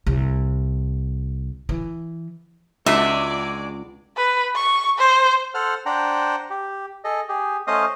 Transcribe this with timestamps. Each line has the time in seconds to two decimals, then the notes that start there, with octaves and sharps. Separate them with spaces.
0.07 C2
1.69 E3
2.86 C#2 G#3 D4 F#4 D5 E5 D6
4.17 B4
4.55 C#6
4.99 C5
5.54 A4 C5 F#5 F6
5.86 D4 C5 F#5 G5 A#5
6.50 G4
7.04 G#4 A4 D#5
7.29 G4 G#4
7.67 A3 C#4 C5 D#5 F5 D#6